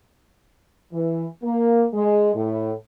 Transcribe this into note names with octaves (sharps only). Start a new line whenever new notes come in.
E3
A#3
G#3
A2